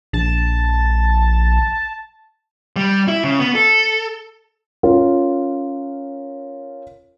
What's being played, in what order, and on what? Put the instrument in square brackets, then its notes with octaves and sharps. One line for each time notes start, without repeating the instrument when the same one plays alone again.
[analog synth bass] A#1 [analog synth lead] A5
[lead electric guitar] G3
E4
C#3
B3
A4
[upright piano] C#4 F4 A#4